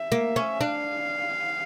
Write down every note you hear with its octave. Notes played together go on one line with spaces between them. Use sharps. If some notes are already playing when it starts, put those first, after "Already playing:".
Already playing: E5
A#3
C#4
D4 F5